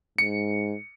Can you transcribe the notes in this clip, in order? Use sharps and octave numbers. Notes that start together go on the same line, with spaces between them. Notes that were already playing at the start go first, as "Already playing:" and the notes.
G#2 C#7